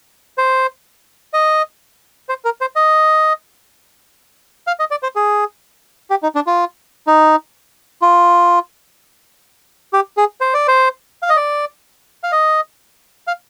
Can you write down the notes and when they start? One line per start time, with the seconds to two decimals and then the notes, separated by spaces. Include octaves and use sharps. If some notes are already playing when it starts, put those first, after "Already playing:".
0.38 C5
1.34 D#5
2.29 C5
2.45 A#4
2.61 C5
2.76 D#5
4.67 F5
4.80 D#5
4.91 D5
5.03 C5
5.16 G#4
6.10 G4
6.23 D#4
6.35 D4
6.47 F4
7.07 D#4
8.02 F4
9.93 G4
10.17 G#4
10.41 C5
10.54 D5
10.68 C5
11.23 F5
11.30 D#5
11.36 D5
12.24 F5
12.32 D#5
13.27 F5